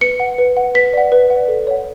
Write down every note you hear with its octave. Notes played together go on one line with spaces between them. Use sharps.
B4 C#7
F#5
B4
F#5
B4 B6
D5 F#5
B4
F#5
D5
A4
C#5 F#5